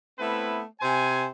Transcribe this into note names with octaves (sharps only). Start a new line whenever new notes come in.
A3 B3 C4 E4 B4
C3 C5 G#5